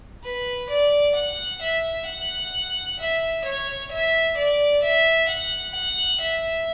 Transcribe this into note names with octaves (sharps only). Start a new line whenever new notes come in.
B4
D5
F#5
E5
F#5
E5
C#5
E5
D5
E5
F#5
F#5
E5